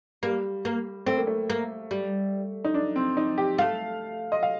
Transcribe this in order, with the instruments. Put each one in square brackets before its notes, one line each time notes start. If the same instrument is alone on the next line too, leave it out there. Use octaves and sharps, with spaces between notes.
[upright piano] G3 [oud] A#3
[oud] A#3
[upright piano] A3 [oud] C4
[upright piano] A#3
A3
[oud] A#3
G3
[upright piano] D#4
D4
C4
D#4
G4
[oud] A3 [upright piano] F5
[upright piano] D#5
F5